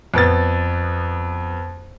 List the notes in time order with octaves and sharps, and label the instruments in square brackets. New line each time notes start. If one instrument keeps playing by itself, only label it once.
[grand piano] F2 B3 A6